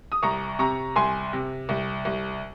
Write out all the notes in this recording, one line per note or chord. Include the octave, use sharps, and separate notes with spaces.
D#6
C2 A#5 C#6
C3 A#5 C#6
C2 G#5 C6
C3
C2
C2